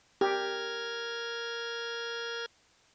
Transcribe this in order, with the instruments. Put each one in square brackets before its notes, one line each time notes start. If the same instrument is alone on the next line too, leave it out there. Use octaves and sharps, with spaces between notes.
[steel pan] G4 [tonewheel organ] A#4 F6 G#6